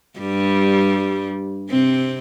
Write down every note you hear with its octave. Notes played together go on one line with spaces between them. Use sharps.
G2 G3
C3 C4